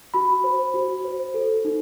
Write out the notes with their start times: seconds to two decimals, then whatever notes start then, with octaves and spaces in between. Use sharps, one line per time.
0.14 F#4 B5
0.44 C5
0.74 F#4
1.04 C5
1.34 A4
1.65 D#4